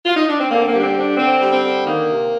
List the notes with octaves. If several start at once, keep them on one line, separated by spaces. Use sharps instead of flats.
F4
D#4
D4
C4
D3 A#3
C4
A#3
G3
D4
C4
D3 D4
D3 C4
G3
C4
D3
D#3 A#3
C3